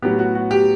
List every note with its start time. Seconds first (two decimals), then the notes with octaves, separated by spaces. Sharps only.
0.02 A2 F#3 B3 G4
0.19 F#4
0.35 F#4
0.51 G4